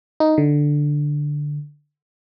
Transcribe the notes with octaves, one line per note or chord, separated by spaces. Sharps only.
D#4
D3